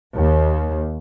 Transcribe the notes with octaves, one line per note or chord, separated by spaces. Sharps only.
D#2